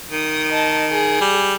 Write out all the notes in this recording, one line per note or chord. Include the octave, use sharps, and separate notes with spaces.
D#3 D#6
D#5 A5
G#4
G3